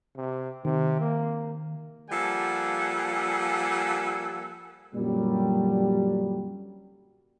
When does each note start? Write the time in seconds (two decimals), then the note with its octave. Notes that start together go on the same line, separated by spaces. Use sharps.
0.16 C3
0.65 C3 D#3
1.00 A#3
2.09 F3 G3 A#3 A4 F#5 G#5
4.94 F#2 A#2 D3 F#3 G3